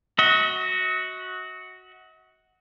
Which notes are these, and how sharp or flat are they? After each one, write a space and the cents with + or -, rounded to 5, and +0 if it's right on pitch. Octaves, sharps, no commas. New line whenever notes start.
F#4 +0 D#5 +45